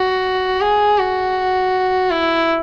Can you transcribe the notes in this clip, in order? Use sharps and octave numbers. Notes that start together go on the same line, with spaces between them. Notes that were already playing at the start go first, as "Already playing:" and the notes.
Already playing: F#4
G#4
F#4
E4